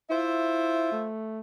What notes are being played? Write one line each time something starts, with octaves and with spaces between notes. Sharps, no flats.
E4 F4 C5 E5
A3